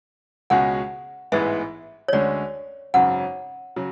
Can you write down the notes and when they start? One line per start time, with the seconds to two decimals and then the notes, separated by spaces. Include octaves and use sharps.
0.50 C#2 B2 G#3 C#4 F#5
1.32 A1 G#2 E3 G#3 B3 E5
2.08 C#5
2.12 D2 D3 G#3 C#4 D5
2.94 G#1 F#2 C#3 F#5
3.76 C#3 F#3